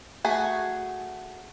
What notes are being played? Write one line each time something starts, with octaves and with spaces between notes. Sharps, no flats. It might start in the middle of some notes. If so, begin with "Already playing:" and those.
A3 F#4 G#4